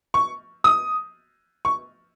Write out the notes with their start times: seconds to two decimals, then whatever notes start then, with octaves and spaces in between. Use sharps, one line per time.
0.14 C#6
0.64 D#6
1.65 C#6